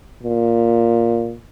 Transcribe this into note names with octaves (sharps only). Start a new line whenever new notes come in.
A#2